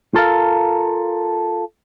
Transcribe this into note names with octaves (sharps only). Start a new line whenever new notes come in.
F4 A4 A#4 F5